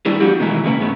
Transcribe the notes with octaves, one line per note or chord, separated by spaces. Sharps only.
G3 D4 E4 G#4
F3 G3 B3 D4 F#4 G4
B2 D#3 E3 G#3 A3 E4
A2 C#3 A#3 C#4 B4
G#2 A3 B3 C#4